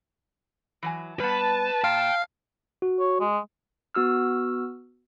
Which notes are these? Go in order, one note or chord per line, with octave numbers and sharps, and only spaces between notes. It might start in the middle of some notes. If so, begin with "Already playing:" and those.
E3 F#3 G#5
G3 B3 B4 A5
A#2 F5 G5
F#4
C#5
G#3
B3 F#4 E6 F6